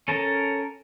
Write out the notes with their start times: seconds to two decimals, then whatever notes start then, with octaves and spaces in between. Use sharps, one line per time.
0.08 C#4 A4 A#4 A5